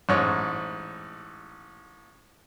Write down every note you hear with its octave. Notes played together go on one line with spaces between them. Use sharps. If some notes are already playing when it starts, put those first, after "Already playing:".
A1 G#2 C#5